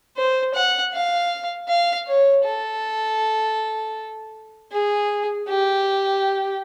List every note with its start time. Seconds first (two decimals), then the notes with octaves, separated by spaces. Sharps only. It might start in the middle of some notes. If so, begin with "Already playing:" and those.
0.17 C5
0.54 F#5
0.93 F5
1.68 F5
2.07 C#5
2.44 A4
4.72 G#4
5.48 G4